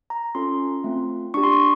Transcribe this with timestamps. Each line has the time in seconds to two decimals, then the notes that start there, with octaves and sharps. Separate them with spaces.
0.10 A#5
0.35 C#4 F4 A4 C6
0.84 A3 C4 F4
1.34 D4 G4 C#6
1.44 C6
1.53 C#6